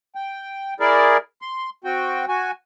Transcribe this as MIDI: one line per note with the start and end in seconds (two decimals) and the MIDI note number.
0.15 0.74 79
0.80 1.17 64
0.80 1.17 68
0.80 1.17 70
0.80 1.17 74
1.42 1.70 84
1.84 2.26 60
1.84 2.26 66
1.84 2.26 79
2.28 2.51 66
2.28 2.51 80